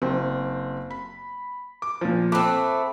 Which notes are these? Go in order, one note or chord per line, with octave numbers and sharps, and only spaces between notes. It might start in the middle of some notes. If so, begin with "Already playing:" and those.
F#1 C4
B5
D6
A#2 F3
A3 C4 B5 D6 F#6